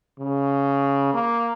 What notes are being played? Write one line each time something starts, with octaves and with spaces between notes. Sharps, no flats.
C#3
A#3